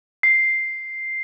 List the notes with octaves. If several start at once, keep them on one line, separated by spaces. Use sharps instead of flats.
C7